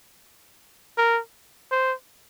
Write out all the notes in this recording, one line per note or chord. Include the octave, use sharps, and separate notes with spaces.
A#4
C5